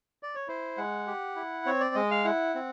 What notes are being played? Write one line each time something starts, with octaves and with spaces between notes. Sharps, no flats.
D5
C#5
E4 C5
G#3 F#5
G4
E4
C4 C#5
D5
G#3 D#5
F5
E4 F#5
C4